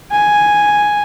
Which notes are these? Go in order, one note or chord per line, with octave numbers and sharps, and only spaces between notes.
G#5